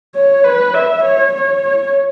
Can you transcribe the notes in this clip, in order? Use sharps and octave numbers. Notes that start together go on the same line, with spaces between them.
C#5
B4
E5
C#5
C#5
C#5